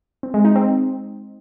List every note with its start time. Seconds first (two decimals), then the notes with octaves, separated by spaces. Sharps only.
0.23 C4
0.34 G#3
0.45 D#4
0.56 C4